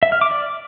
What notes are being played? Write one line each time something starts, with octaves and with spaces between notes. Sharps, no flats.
E5
F6
D6
D5